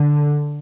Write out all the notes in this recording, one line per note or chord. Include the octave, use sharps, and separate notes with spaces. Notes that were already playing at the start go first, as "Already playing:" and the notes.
Already playing: D3